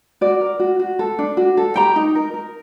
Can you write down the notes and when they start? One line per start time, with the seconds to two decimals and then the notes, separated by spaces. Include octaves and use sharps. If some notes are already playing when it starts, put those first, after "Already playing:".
0.21 F#4 D5
0.41 A#4
0.60 F#4
0.79 F#4
0.99 A4
1.19 D4
1.37 F#4
1.57 A4
1.76 G4 G5 A#5
1.96 D#4
2.15 A#4
2.34 A#4